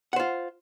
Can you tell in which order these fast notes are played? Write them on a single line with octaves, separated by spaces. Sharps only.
F#5 C5 F4